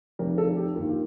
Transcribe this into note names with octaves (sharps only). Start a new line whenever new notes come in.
F1 F2 C3 A#4
A4
G4
G2 D#3 A#3 F4
G4